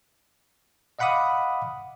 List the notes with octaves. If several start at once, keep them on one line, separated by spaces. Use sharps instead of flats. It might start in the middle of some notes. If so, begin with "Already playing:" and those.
D#5 F5 F#5 B5 D6 D#6